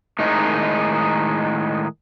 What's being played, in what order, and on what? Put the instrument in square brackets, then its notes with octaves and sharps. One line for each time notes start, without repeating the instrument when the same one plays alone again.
[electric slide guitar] A2 D#3 G#3 D#4